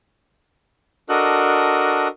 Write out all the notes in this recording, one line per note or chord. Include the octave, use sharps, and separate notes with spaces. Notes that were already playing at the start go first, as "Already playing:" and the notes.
D4 F#4 A4 A#4 D#5 F#6